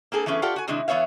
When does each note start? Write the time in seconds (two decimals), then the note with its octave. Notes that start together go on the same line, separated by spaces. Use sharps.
0.12 A#3 C4 G#4 A4
0.26 E3 A3 B3 C#4 G#4
0.42 F4 G4 A4 D5 F#5
0.56 F#4 G#5
0.68 C3 D#3 G#3 D4 E4
0.88 E3 B3 C#5 E5 F5